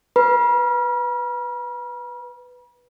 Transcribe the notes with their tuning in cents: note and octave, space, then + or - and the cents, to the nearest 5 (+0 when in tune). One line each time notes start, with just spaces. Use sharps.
B4 +0 B5 -45